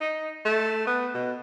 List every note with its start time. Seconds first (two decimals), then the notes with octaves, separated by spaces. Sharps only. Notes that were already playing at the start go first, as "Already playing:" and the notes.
0.01 D#4
0.45 A3
0.87 B3
1.15 B2